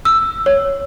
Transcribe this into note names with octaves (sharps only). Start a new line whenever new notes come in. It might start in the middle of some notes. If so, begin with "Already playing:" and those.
E6
C#5